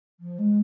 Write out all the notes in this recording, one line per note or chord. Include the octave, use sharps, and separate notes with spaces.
F3
G#3